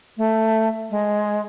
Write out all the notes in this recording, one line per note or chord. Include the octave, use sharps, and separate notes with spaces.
A3
G#3